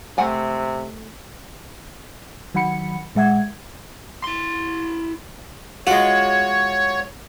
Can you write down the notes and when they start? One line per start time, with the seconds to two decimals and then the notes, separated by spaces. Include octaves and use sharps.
0.18 C3 A3 F#5 G#5
2.55 D#3 F#3 F#5 B5 C#7
3.15 A#2 G#3 E5 F#5 G#6
4.24 E4 C6
5.87 G#3 F4 F#4 C#5